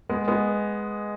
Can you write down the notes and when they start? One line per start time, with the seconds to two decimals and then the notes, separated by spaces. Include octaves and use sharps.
0.09 G#3 B3
0.28 G#3 B3